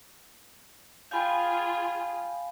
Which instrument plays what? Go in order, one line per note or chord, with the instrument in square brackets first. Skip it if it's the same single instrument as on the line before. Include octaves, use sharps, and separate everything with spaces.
[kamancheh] F4 G#4 [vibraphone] F5 G#5 [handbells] G5 B5 G6